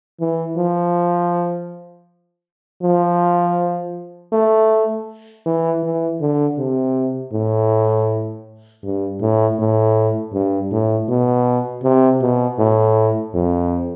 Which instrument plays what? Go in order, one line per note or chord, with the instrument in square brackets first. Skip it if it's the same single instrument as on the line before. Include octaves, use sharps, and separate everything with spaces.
[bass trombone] E3
F3
F3
A3
E3
E3
D3
C3
A2
G2
A2
A2
G2
A2
B2
C3
B2
A2
F2